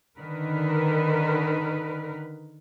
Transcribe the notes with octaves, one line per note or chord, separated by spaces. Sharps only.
D3 D#3 A#4 B4